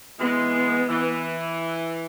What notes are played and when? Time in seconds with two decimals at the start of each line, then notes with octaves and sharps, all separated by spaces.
0.20 E3 G#3 B3
0.89 E3